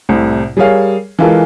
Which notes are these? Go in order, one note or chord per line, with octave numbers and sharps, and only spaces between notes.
C2 A2 C3
G3 G#4 A#4 C#5 F5
E3 G#3 F4 A4 A#4